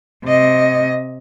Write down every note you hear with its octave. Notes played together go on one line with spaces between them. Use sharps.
C3 D#5